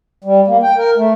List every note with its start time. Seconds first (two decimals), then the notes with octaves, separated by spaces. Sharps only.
0.24 G3
0.48 A#3
0.63 G5
0.78 A#4
0.97 A3